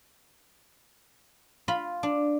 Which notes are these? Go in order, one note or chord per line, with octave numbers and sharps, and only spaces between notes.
F4 B5
D4